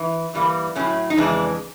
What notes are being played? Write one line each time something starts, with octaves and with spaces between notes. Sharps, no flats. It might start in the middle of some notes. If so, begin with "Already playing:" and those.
Already playing: E3
G2 E3 G3 A#3
A2 F#3 A3 C#4
D#4
F2 C#3 E3 G#3 D4